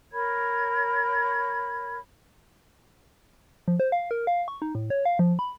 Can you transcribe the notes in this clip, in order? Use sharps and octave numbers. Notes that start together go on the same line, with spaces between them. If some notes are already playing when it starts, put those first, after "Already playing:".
A#4 C#5 B5 G#6
F3
C5
F5
A#4
F5
C#6
D#4
A2
C#5
F5
F3
B5